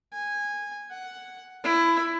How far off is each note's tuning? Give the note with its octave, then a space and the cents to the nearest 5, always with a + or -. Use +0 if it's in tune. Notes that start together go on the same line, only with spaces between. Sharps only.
G#5 -15
F#5 +5
E4 +20